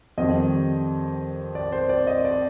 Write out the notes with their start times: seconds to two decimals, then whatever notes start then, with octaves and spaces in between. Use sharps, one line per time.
0.18 F2 D#3 G3 D#5
1.55 D5
1.72 C5
1.89 D5
2.07 D#5
2.25 D5